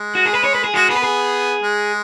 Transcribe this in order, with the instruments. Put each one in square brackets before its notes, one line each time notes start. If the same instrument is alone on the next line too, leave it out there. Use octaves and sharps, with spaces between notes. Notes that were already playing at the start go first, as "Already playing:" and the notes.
Already playing: [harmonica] G#3
[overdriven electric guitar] F#4
G#4
B4
C#5
B4
G#4
[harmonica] G#3 [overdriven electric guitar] F#4
[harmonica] B3 [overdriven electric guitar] G#4
[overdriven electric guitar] B4
G#4
[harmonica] G#3